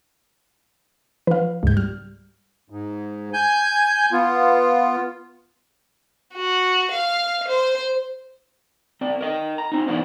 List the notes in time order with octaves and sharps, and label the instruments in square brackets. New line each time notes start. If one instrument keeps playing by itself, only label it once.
[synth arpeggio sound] F3 [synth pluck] B4 F5
[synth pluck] C#2 G6 [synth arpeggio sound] G#2
[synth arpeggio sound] G3 [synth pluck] F6
[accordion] G#2
G#5 G6
B3 F4
[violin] F#4
F5
C5
[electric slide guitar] C4 D5
A#4 D#5
A#5
C4 D#4
E3 B3 C4 D4 D#4 C5